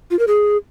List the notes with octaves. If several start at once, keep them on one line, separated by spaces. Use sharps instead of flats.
F4
A#4
G#4